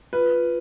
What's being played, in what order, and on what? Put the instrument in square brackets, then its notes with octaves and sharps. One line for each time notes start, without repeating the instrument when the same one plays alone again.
[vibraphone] F4 [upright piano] B4